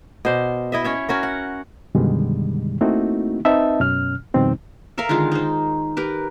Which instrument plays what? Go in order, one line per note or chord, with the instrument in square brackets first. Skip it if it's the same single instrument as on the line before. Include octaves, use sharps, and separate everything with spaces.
[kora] B2 C5 D5
E4 D#5 E5
C#4 C#5 E5
C#4 F#4 A#4
F#5
[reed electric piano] F#2 B2 D3 D#3 G3 G#3
A3 A#3 C4 D#4 E4 F#4
C4 D#4 B4 D#5 E5 A5
F#2 B2 C#4 F6
F2 B2 D#3 G3 C4 D#4
[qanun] A4 A#4 E5 F5
D3 D#3 G#3 F4
D#4 C5
G4 A#4 B4